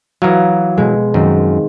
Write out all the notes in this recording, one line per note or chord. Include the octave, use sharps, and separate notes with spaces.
E3 F#3 F5 A#5 D#6
B2 G#3
F#2 D#3 C4